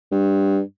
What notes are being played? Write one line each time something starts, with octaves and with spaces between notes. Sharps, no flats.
G2